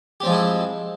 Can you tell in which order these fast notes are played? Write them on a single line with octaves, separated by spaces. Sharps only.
G4 C4 F3 G#3 E4